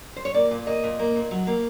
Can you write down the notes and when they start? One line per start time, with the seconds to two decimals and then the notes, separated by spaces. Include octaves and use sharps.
0.16 C5
0.25 C#5
0.34 A#3 D5
0.51 A#2
0.67 A#3 D#5
0.83 A#2
0.99 A#3
1.15 A#2
1.31 F#3
1.47 A#3